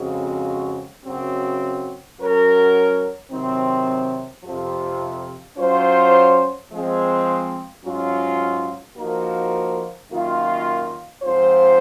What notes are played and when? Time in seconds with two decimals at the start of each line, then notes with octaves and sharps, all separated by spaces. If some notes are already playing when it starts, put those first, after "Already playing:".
Already playing: F2 C#3 G#3 C4 F#4
1.05 F#2 C#3 F#3 C4 F#4
2.18 F#3 C#4 F#4 A#4 C#5
3.31 C3 D#3 F#3 C4
4.44 F2 C3 F3
5.57 F#3 C#4 F4 C5
6.71 F3 G#3 C4
7.84 G#2 F#3 C#4 F4
8.96 F3 A#3 D#4 F#4 A#4
10.10 F#2 D#3 A#3 F4 A#4
11.23 G#2 F3 C4 F4 C5